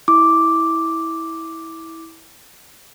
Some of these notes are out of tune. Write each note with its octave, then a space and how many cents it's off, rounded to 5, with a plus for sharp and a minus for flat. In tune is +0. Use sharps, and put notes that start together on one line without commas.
E4 -15 D6 +0